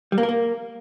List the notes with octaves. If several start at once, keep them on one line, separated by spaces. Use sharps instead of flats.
G3
A#3
A#4
A#3